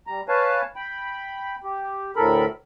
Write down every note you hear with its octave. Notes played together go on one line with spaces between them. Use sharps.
G3 A#5
B4 C#5 F5 G#5 A5
G5 B5
G4
D2 A2 A4 A#4 B5